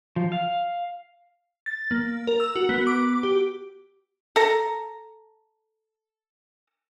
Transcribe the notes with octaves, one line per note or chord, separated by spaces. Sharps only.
F3
F5
A6
A#3
A#4
E6
F#4
B3
D6
G4
A4 A#5